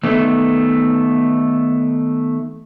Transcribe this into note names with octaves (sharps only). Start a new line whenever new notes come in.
D#3 A3 B3